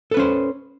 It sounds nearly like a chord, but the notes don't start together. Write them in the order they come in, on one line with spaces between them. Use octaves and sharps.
A4 B4 C#4 C5